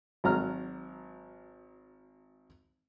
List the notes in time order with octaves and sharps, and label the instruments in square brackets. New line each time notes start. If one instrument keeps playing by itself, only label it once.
[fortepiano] G#1 F#3 A#5 F6